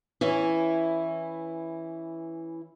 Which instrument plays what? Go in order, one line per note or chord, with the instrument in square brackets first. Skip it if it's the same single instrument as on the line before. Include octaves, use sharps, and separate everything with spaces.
[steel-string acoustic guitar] E3 C#4 E4